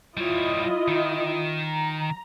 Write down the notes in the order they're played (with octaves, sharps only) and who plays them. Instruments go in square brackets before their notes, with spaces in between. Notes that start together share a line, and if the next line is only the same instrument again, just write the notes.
[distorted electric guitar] G3 C#5 [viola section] E4 F4 D#5
[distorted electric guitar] D#3
[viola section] A#5